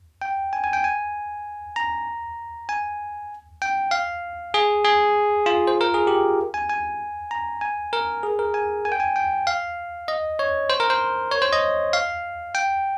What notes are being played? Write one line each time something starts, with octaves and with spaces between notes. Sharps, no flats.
G5
G#5
G#5
G5
G#5
A#5
G#5
G5
F5
G#4
G#4
F4
C5
A#4
G#4
G4
G#5
G#5
A#5
G#5
A#4
G#4
A#4
G#5
G#5
G5
G#5
G5
F5
D#5
C#5
C5
A#4
C5
C#5
C5
D#5
F5
G5